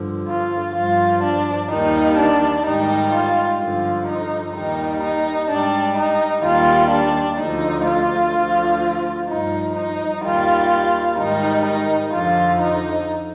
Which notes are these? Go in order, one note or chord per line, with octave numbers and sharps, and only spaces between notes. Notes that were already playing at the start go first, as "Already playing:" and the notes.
Already playing: G2 D3 F3
F4
G2 F3 F4
D4
D#2 D#3 G3 D#4
D4
G#2 D#3 G3 D#4
F4
G2 D3 F3 F4
D#4
D#2 D#3 G3 D#4
D#4
G#2 G3 D4
D#4
D#2 D#3 G3 F4
D4
D2 D3 F3 D#4
F4
D2 D3 F3
G2 F3 D#4
D#4
D#2 D#3 G3 F4
G#2 D#3 G3 D#4
D#4
F2 D3 F3 F4
D#4